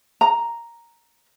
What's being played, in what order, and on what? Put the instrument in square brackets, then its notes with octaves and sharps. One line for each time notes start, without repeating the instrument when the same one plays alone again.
[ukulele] A#5